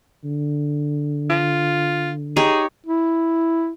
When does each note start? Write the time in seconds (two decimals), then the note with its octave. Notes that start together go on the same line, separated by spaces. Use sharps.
0.25 D3
1.30 F4
2.37 D#4 G4 G#4 C#5
2.86 E4